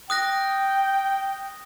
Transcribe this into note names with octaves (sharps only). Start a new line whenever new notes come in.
G5 D#6 F#6 A#6